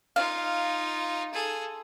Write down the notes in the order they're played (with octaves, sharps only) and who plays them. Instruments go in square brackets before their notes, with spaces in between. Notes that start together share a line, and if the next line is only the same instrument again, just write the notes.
[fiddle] D#4 F4 [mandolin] F5
[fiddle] G#4 A4